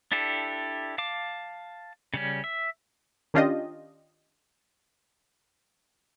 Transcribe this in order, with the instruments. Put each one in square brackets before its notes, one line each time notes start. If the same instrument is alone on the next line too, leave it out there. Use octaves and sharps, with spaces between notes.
[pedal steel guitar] D4 E4 G4 A4
F5 A5 D6
C#3 G3 C#4
E5
[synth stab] D#3 C#4 D4 F4 G4 D#5